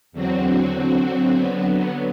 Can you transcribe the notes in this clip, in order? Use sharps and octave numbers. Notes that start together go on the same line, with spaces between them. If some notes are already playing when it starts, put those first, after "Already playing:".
E2 D3 F#3 C4 F#4
D3 F#3 C4 F#4
D3 F#3 B3